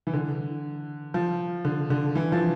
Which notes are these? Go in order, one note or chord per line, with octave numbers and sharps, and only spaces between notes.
E3
D3
F3
D3
D3
E3
F3